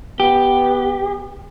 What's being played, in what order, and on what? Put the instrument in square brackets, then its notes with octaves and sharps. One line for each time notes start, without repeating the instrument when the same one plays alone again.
[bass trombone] B3 [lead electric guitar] G4